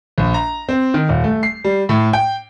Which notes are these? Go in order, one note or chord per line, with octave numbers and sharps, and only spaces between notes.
A#1
A#5
C4
D#3
D#1
A3
C7
G3
A2
G5